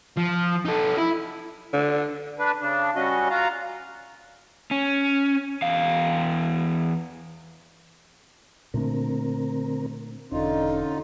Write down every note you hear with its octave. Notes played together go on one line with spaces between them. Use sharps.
F3
D#4 A4
E4
D3
D4 B4
C#3 D4
G3 C#4 F#4 D#5
F4 F#4 F5 A#5
C#4
E2 F5
A#2 D3 A3 C4 D4 A#4
E1 D3 C#4 D#4 F4